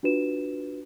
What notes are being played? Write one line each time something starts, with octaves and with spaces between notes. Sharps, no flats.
D4 F4 F#4 B4 E7